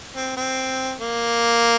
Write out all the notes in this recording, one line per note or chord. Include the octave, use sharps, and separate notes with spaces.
C4
C4
A#3